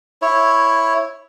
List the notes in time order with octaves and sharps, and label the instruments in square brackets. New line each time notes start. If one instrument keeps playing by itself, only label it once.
[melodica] E4 C#5